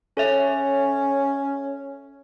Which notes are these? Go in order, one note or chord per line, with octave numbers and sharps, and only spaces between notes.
C#4 A4 C#5 E5